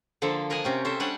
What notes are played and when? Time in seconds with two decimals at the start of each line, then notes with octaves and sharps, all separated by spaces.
0.22 D3 F3 A#3 A4
0.50 D4 A#4 D#5 F#5 G#5
0.64 C3 C#4 G4
0.85 C#4 A4 C5 E5
1.00 G3 D4 C#5 F#5 G#5